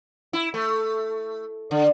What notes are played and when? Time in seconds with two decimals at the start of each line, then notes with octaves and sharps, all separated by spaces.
0.33 E4
0.54 A3
1.71 D3